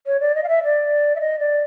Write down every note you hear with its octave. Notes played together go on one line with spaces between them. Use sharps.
C#5
D5
D#5
F5
E5
D5
E5
D#5
D5